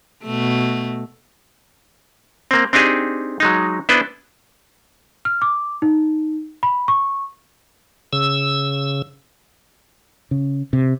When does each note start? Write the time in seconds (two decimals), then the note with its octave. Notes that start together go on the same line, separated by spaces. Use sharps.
0.24 B2 A3
2.51 A#3 C4
2.73 C4 D4 D#4 G4 G#4
3.40 F#3 G#3 D#4
3.89 B3 D4 E4 B4 C5
5.25 F6
5.42 D6
5.82 D#4
6.63 B5
6.88 C#6
8.13 C#3 E6
10.31 C#3
10.73 C3